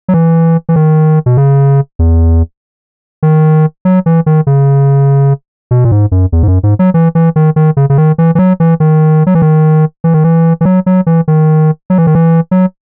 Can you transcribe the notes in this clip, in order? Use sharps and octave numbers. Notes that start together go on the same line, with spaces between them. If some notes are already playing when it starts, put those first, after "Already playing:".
F#3
E3
E3
D#3
B2
C#3
E2
D#3
F#3
E3
D#3
C#3
B2
A#2
G#2
F#2
E2
G#2
F#2
G#2
F#3
E3
E3
D#3
D#3
C#3
C#3
D#3
E3
E3
F#3
E3
D#3
F#3
E3
D#3
E3
D#3
E3
E3
F#3
F#3
E3
D#3
F#3
E3
D#3
E3
F#3